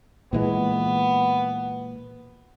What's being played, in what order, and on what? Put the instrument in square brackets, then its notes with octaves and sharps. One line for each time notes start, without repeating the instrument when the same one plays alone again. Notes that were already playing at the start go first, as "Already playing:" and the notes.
[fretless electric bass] A#2 E3 G#3 [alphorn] B3